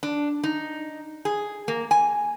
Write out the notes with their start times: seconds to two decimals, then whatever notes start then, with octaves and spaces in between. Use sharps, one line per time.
0.03 D4
0.43 D#4
1.25 G#4
1.68 A#3
1.91 G#5